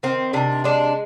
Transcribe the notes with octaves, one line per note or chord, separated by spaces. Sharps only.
D#3 C4
C3 D4
G#3 D4